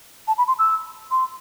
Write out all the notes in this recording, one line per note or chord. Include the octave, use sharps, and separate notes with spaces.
A5
B5
C6
E6
C6